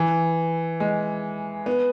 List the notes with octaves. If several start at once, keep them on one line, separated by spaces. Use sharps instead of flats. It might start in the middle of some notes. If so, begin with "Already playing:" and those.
Already playing: E3
G#3
B3